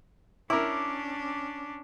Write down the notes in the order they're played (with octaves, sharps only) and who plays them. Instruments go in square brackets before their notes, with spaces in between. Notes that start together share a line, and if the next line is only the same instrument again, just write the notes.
[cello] C#4 D4 [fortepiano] E4 A#4 [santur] D6